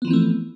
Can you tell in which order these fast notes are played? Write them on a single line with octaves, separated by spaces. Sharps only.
B3 F3 E3 C4 A3